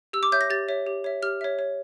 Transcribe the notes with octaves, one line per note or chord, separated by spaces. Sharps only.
G4 E6
D6
C#5 E5 G6
A#6
G4 A6
C#5 E5
G4
C#5 E5
G4 F6
C#5 E5
C#5